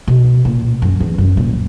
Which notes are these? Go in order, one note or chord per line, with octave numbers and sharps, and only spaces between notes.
B2
A#2
F#2
E2
F#2
A#2